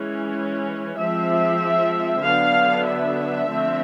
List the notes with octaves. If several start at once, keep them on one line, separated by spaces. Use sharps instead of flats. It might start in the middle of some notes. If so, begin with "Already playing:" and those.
Already playing: E3 G#3 C#4
F3 G#3 C4 E5
D3 F#3 B3 D4 F5
E5
D3 F3 A3 C4